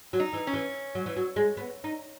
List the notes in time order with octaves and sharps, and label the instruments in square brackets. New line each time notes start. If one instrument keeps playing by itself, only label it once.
[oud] F#3
[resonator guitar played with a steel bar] D#4
[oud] E3
[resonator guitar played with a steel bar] C#4
[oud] E3
F#3
E3
F#3
G#3
B3
D#4